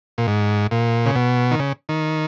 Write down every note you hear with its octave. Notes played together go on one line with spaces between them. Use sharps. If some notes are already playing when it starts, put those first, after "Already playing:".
A#2
G#2
A#2
C#3
B2
D#3
C#3
D#3